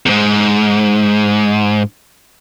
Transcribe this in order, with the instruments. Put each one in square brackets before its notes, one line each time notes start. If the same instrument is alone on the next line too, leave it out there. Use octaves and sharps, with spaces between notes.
[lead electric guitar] E2 G#2